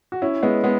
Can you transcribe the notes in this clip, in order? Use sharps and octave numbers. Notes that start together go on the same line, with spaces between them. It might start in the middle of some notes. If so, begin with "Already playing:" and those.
F#4
C#4 E4
G#3 B3
G#3 B3